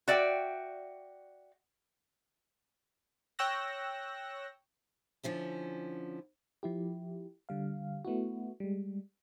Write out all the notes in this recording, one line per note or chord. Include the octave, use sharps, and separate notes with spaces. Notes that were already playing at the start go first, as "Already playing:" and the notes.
F#4 D5 E5 G5
C#5 G5 C#6 E6 F#6 A#6
D3 F3 C#4 E4
F3 E4 G4
D3 G3 F5
A3 B3 E4 F#4
G3 G#3